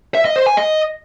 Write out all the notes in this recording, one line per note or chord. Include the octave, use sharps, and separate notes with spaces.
E5
D#5
C5
G#5
D#5